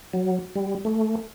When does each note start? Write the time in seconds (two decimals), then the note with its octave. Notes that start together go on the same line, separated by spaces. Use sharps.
0.13 F#3
0.55 G3
0.85 A3